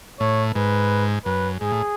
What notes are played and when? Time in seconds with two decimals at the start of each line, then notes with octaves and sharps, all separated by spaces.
0.20 A2 C#5
0.55 G#2 B4
1.25 F#2 B4
1.61 G#2 G#4
1.72 A2